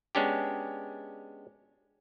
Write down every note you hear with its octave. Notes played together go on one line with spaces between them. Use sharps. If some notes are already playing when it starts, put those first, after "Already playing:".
G#3 B3 C#4 D4 G4